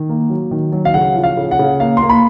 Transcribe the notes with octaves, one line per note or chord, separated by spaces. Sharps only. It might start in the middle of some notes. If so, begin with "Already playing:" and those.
Already playing: D#3
A#3
F#3
D#3
F#3
F5
C#3 F#5
F3
F5
C#3
F#5
C#3
A#3 F5
C6
A#3
B5